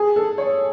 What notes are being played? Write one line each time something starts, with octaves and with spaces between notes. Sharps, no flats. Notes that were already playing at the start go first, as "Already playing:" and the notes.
Already playing: G#4
A4
C#5